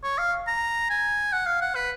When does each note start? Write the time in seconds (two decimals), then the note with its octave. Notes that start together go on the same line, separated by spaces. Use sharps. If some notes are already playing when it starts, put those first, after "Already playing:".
0.03 C#5
0.18 F5
0.47 A#5
0.90 G#5
1.32 F#5
1.46 F5
1.61 F#5
1.75 B4